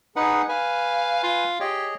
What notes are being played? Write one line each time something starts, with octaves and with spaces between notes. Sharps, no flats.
D#4 G#4 B4 F#5
B4 F5 G#5
F4
G4 G#4 C#5 D#5